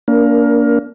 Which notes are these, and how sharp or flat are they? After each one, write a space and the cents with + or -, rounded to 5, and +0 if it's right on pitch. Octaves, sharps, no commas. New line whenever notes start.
A#3 +0 D4 -30 A#4 +20